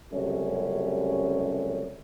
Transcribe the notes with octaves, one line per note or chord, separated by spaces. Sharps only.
C#2 F#2 C3 G3 A3 C#4